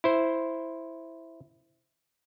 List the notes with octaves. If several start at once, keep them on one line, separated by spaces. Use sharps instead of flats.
E4 C5